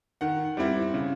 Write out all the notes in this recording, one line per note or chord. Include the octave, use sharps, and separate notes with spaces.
D#3 F#5
G3 C4 E4
C#3